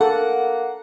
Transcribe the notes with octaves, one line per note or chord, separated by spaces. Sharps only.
A#3 A4 F#5